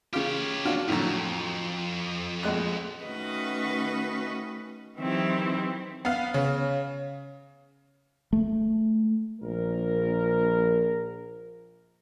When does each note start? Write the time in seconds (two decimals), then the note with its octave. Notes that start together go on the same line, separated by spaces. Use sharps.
0.13 C#3 F4 G4 C#5
0.65 D4 F4 F#4
0.88 F2 A2 D3 F#3
2.43 A#1 G#3 F#6
3.04 D#3 A3 C#4 F#4 B4 D#5
4.97 D#3 E3 F#3 C4 E4 G4
6.05 B3 F5
6.34 C#3
8.33 A3
9.42 A#1 A#4